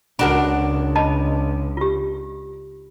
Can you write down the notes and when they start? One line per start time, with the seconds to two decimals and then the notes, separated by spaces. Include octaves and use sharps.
0.19 C#2 D4 F#4 A#4 B5
0.96 D#5 A5 B5
1.77 F4 G4